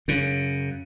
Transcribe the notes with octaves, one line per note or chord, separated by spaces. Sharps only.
F#2 C#3